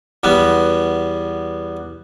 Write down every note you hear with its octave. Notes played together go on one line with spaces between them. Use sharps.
E2 G3 B3